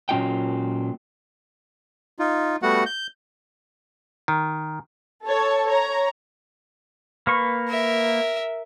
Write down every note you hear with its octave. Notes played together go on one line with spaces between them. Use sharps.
A#2 F#3 C#4 F4 D#5 G5
D#4 F4
G3 A3 B3 F#4 F#5
G6
D#3
A4 C#5 A5
C#5 A#5
A#3 B4 C#6
A#4 E5